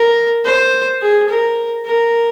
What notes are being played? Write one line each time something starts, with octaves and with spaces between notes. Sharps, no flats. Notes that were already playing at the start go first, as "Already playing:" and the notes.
Already playing: A#4
C5
G#4
A#4
A#4